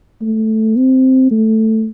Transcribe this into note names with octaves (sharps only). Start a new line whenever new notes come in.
A3
C4
A3